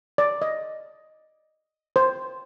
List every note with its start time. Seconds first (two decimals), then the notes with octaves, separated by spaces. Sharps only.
0.18 D5
0.42 D#5
1.96 C5